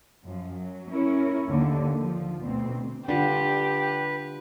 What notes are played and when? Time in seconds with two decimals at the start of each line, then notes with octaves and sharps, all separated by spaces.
0.23 F#2 F3
0.54 F#3
0.89 C#4 E4 A#4 C#5
1.48 D#2 D3
1.98 F3
2.41 D2 B2 C4
3.08 D3 G3 D4 F4 G4 B4